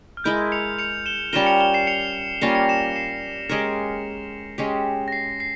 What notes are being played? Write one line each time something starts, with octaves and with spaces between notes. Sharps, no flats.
F6
G#3 E4 A#4 G6
C#7 F7
C#7 F7
E7 G7
G3 C#4 F4 A#4 E7 G7
C#7 F7
E7 G7
C7 E7
C#7 F7
G3 A#3 C#4 F4 A#6 C#7
A#6 C#7
C7 E7
C7 E7
G#3 C#4 G4 A#4 A#6 C#7
G#3 C#4 G4
A#6
C7
C7